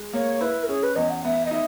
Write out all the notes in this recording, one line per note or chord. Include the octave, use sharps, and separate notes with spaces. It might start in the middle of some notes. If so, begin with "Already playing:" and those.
Already playing: G#3
A#3 C#5
E4 B4
A#4
C#4 G#4
B4
E2 D#5
F#5
B3 E5
D#5
D#4 E5